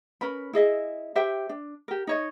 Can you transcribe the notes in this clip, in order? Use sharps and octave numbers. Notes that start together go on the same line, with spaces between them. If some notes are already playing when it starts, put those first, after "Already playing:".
C#4 A#4 B4 B5
E4 G#4 D#5 E5
G4 C5 E5 G5
D4
G4 A#4
D#4 C#5 D#5